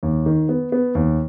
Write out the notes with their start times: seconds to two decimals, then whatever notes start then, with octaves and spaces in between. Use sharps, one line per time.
0.03 D#2
0.26 D#3
0.49 B3
0.72 B3
0.95 D#2